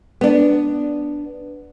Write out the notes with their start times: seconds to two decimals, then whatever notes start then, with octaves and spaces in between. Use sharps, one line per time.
0.21 B3 D4